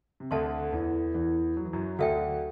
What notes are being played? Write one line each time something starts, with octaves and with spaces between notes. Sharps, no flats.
C3
D2 D3 A4 E5 A5 C6
E2 E3
E2 E3
F#3
E3
F#2 F#3
D2 D3 F#4 A4 E5 G5